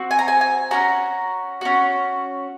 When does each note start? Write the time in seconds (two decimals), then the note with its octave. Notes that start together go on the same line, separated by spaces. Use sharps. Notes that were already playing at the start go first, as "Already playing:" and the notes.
Already playing: C4 F#4
0.11 G#5
0.19 A#5
0.28 G#5
0.41 G#5
0.71 C#4 F#4 A#5
1.61 C#4 F#4